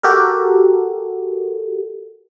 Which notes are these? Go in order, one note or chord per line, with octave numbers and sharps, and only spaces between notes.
F#4 G4 A4 A#4